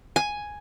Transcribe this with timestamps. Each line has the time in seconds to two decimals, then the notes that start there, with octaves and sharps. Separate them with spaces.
0.16 G#5